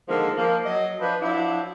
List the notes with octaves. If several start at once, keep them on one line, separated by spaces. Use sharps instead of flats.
D3 D#3 F3 G#3 A#3
F3 A#3
F#3 D#5
F3 D4 B4
F3 F#3 D4 E4 F#4